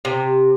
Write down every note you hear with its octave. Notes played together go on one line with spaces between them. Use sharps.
C3